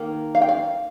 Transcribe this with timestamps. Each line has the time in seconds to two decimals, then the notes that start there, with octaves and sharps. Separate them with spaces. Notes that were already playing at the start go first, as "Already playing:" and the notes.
Already playing: D#3 A#3
0.35 F5
0.42 G5
0.49 F5